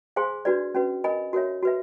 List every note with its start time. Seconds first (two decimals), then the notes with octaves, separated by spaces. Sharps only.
0.16 G#4 C5 F5 G#5 C6
0.45 D4 F#4 B4 D5
0.75 C#4 F#4 B4
1.04 A#4 D#5 G#5 B5
1.33 F#4 A#4 C#5 E5
1.63 F#4 B4 E5